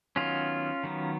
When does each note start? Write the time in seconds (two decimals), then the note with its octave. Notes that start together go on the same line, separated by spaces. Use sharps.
0.16 D#3 F#3 B3 C#4 F4
0.83 D#3 F#3 B3